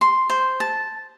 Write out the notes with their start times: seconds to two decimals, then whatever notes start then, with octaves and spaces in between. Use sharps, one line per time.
0.01 C6
0.30 C5
0.60 A5